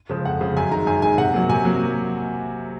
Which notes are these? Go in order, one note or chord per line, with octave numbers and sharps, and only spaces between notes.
C#3 F3 G#3
F2 F#5
C#3 F3 G#3
F#2 G#5
D#3 G#3 A#5
F#2 G#5
D#3 G#3 G#5
C3 F#5
F#3 A#3
C3 G#5
F#3 A#3